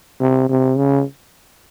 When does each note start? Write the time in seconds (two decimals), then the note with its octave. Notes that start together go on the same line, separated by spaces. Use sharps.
0.20 C3
0.50 C3
0.77 C#3